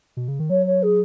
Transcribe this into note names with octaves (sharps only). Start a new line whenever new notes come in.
B2
C#3
D#3
F#3 C#5
C#5
G#4